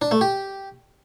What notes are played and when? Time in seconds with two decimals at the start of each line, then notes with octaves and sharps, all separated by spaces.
0.02 D4
0.11 A3
0.21 G4